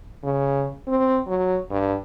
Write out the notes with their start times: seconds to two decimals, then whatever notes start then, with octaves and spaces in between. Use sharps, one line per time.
0.24 C#3
0.88 C4
1.27 F#3
1.71 G2